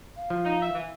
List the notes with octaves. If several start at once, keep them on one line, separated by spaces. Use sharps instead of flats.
F5
F3
D#4
E5
E3